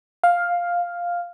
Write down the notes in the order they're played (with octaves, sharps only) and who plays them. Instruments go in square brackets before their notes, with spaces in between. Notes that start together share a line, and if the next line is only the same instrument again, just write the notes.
[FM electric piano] F5